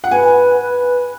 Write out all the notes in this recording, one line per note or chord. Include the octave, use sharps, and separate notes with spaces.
F#5
B4 G#5
B4